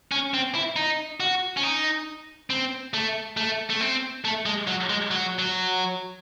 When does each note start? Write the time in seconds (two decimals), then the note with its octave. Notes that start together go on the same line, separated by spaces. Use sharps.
0.12 C#4
0.34 C4
0.55 E4
0.76 D#4
1.20 F#4
1.57 C#4
1.63 D#4
2.50 C4
2.94 A3
3.37 A3
3.70 A3
3.81 C4
4.25 A3
4.46 G#3
4.67 F#3
4.89 G#3
5.11 F#3
5.39 F#3